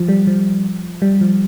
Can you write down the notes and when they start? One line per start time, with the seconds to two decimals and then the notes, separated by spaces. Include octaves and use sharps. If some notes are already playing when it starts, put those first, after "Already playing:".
Already playing: F3
0.08 G3
0.27 F3
1.02 G3
1.21 F3